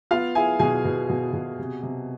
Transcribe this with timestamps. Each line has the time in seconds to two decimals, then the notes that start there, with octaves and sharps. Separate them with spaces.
0.11 B3 F4 F5
0.35 E4 G#4 G#5
0.59 B2 G#4 G#5
0.85 B2
1.09 B2
1.33 B2
1.59 C3
1.83 C3